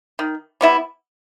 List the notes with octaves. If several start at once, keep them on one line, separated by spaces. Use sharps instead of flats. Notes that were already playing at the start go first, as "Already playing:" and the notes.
D#3
G3 B3 E4